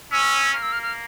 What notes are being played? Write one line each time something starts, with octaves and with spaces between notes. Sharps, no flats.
C#4 E6
A#3 F6
E6
F6
F6